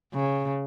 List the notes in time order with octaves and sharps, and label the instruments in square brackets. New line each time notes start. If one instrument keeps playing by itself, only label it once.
[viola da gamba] C#3